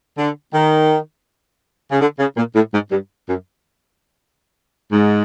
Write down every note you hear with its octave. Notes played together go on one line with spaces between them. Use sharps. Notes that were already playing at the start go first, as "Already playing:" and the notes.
D3
D#3
C#3
D3
C#3
A#2
A2
G#2
G2
F#2
G#2